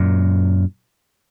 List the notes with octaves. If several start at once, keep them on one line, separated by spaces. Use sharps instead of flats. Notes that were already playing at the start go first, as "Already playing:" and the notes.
Already playing: F#2 A#2